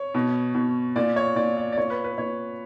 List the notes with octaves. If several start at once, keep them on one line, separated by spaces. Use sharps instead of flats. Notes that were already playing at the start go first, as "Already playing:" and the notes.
Already playing: C#5
B2
B2
A#2 D5
C#5
A#2 D5
D5
D5
A#2 C#5
B4
B4
A#2 C#5